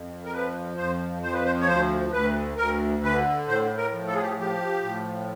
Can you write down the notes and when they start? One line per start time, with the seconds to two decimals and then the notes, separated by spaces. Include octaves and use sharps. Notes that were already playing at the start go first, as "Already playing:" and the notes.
Already playing: F2
0.25 A#4
0.33 F3 B4
0.77 F2 C5
1.23 F3 C5
1.33 B4
1.45 C5
1.61 C#5
1.67 D2 C5
2.12 D2 B4
2.57 D2 A#4
3.03 D3 B4
3.47 A2 C5
3.78 A#4
3.93 F3
4.08 A4
4.15 G#4
4.22 G4
4.28 G#4
4.38 F3 G4
4.82 A2